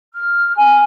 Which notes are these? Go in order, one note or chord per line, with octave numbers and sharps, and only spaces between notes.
F6
G#5